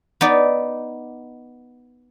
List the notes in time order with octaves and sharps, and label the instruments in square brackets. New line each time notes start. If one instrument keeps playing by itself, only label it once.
[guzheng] B3 D#4 D5